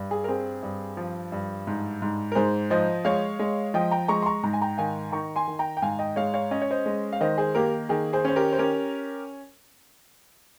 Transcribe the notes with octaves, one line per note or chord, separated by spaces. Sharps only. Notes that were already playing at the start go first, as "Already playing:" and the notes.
Already playing: G2
G#4
A#4
C4 G#4
G2
F3
G2
G#2
G#2
A#4
G#2 G#4 C5
F3 C5 D#5
G#3 C#5 F5
G#3
F3 D#5 G5
G5 A#5
G#3 A#5 C#6
C6
A#5 C#6
G#2 A#5
G#5
G5 A#5
D#3 F5 G#5
D#3 A#5 C#6
G#5 C6
D#3
G5 A#5
G5
G#2 F5 G#5
D#5 G5
G#3 C#5 F5
C#5 F5
C#4 D#5
C#5
C5 D#5
G#3
F5
D#3 C5 D#5
G#4 C5
A#3 G4 A#4
D#3 G#4
G#4 C5
C#4 C5
G4 A#4
C5
C#4 G4 A#4